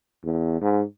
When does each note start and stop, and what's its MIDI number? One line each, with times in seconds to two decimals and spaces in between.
0.24 0.60 40
0.62 0.82 44